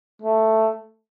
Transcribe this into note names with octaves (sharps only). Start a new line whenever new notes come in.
A3